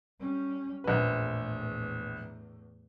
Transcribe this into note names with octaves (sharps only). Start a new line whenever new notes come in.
G3 C#4
A#1 E2 A2 B4